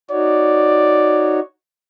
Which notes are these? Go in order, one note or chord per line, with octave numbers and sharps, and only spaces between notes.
D#4 F#4 C#5 D5